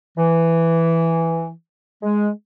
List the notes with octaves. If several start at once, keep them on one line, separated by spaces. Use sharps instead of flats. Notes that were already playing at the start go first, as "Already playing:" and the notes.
E3
G#3